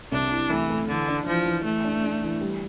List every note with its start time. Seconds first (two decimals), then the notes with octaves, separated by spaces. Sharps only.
0.12 C2 D4
0.31 E4
0.50 E3 A3
0.70 A3
0.88 D3 E3
1.08 D4
1.26 E3 F3
1.45 E3
1.65 E3 A3
1.84 D4
2.03 D4
2.22 E3
2.41 G3